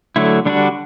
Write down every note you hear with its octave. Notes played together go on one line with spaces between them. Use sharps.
D3 F#3 A3 E4
D3 G3 D4 F#4